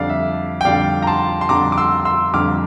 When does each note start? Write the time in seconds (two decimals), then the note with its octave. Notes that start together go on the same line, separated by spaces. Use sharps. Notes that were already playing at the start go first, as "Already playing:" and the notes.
Already playing: F2 D3 G3 D4 D5 F5
0.09 E5
0.61 G5
0.65 F2 D3 G3 D4 D5 F5
1.02 A#5
1.07 A5 C6
1.41 C6
1.49 F2 D3 G3 D4 A#5 D6
1.72 D6
1.77 C6 E6
2.05 C6 E6
2.34 F2 D3 G3 D4 D6 F6